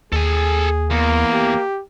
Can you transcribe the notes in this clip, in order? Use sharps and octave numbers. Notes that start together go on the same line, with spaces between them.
D#2 G#4 A4 G#5
E2 A#3
G4